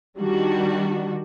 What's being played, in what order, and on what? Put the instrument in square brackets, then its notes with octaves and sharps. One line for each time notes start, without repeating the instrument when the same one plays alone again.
[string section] D#3 G3 D4 F#4